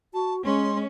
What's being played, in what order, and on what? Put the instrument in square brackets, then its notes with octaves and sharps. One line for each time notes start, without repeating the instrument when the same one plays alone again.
[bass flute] F#4 [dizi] A5
[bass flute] G#3 [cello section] C#4 [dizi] C6